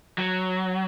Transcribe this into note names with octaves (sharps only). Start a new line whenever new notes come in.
F#3